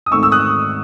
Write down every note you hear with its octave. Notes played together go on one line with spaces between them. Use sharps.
D#6
G#2 D#3 A3 C4 D#4 C#6 E6
E6
D#6 F#6